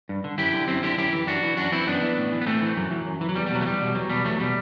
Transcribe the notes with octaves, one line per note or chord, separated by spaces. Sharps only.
G2
D3
F#2 E4 G4
D3
F#2 C4 E4
D3 E4 G4
F#2 E4 G4
E3
F#2 D4 F#4
E3
F#2 D4 F#4
E3 C4 E4
F#2 B3 D4
E3
A2
E3
B3
A2 A3 C4
E3
F#2 F#3
E3
F#2
E3
F#3
E2 G3
G3
B2 F#3
A3
E2 G3
B2
E2 F#3
B2 G3
E2 F#3 A3
B2 G3